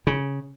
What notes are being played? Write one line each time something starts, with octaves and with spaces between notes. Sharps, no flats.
C#3